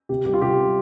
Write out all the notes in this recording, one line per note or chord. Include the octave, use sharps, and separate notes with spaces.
C3 G4
G3 G4
F4
C3 G4
G3